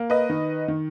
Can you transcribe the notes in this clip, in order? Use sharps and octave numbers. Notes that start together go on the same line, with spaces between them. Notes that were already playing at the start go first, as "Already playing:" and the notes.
Already playing: A#3
B4 D#5
D#3
D#3